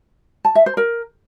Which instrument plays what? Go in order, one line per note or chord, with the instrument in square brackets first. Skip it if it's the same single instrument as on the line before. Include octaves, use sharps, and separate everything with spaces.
[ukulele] A5
E5
C5
A#4